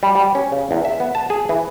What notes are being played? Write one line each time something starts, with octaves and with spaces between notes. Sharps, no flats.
G3
G3
C#4
C#3
E2
E5
B3
A5
G#4
E3